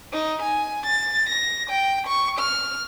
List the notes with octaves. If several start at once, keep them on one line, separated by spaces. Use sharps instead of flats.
D#4
G#5
A6
A#6
G5
C#6
F6